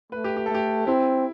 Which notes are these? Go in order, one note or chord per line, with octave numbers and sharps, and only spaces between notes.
A3 B4
G4
G4
A3 A4
G4
C4 E4